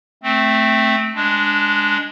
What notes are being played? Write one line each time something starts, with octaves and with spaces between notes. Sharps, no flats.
A3 C4
G#3 D4